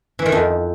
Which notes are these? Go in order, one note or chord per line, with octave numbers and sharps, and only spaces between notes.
E3
D#3
F2